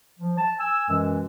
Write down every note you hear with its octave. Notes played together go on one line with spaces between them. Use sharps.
F3
A5
G#5 E6
F#2 B2 E3 G#3